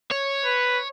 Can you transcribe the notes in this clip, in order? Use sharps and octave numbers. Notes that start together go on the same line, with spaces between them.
C#5
B4